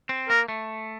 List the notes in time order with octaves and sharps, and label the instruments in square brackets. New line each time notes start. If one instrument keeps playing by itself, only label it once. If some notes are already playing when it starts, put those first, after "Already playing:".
[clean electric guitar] C4
[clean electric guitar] A#3 [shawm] A#4
[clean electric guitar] A3